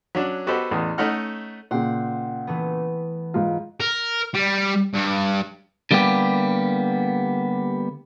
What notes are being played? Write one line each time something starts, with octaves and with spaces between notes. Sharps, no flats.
F#3 C#4 D4
B3 F#4 G4 A4 C5 D#5
A1 E2 D#6
A3 C#4 D#4 D#5 F#5 F6
A#2 C#3 F#5 G5 C6
E3 A3 B3
G#2 F4
A#4
G3
G2
D3 G3 A#3 B3 G4